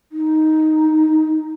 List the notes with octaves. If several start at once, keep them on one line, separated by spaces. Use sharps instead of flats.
D#4